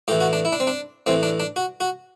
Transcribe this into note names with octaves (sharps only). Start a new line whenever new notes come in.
A2 E3 G4
F#4
D4
E4
D4
C4
D4
A2 E3 C4
D4
D4
F#4
F#4